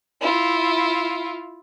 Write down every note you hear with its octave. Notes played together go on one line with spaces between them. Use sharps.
E4 F4